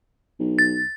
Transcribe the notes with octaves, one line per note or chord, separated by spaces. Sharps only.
B1
A6